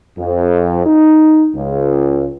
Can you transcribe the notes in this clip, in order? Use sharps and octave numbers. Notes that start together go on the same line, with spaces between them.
F2
D#4
C#2